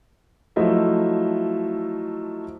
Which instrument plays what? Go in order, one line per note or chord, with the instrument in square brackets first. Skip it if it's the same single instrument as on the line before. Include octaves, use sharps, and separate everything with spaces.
[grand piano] F3 F#3 A3 E4 D#5 E5